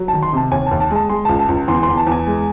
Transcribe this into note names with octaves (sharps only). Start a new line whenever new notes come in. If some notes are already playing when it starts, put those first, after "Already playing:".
Already playing: F#3
D#3 A5
C6
C3 A5
D#2 G#5
D#2 A5
A5
G#3 A5
G#3 C6
C#2 A5
A5
C#2
E2 C6
C6
E2
A5
E2
G#5
G#3